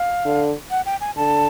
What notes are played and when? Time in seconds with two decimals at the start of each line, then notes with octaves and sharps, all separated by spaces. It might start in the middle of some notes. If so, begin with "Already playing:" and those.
Already playing: F5
0.25 D3
0.71 F#5
0.86 G5
1.01 G#5
1.16 D3 A5